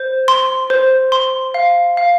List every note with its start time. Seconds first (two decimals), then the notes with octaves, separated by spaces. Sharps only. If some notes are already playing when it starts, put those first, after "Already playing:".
Already playing: C5
0.28 C6
0.70 C5
1.12 C6
1.54 F5
1.97 F5